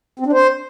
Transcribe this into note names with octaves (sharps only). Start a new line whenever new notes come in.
C4
D4
C5